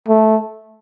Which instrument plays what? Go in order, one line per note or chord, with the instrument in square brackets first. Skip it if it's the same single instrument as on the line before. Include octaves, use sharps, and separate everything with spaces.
[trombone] A3